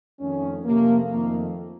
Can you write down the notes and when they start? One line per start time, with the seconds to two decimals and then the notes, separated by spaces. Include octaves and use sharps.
0.20 F2 D#3 A3 C#4
0.65 F2 C3 F3 A3 A#3
1.10 F2 D#3 A3 A#3